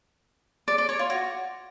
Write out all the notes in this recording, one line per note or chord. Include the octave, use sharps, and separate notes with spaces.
D5
D5
C#5
F4
F#4